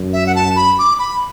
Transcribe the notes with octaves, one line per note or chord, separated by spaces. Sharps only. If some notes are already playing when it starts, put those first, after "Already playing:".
Already playing: F#2
E5
F#5
A5
B5
D6
B5